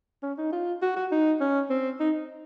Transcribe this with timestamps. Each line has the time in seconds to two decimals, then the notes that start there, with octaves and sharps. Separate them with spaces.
0.23 C#4
0.38 D#4
0.52 F4
0.82 F#4
0.96 F#4
1.11 D#4
1.41 C#4
1.70 C4
2.00 D#4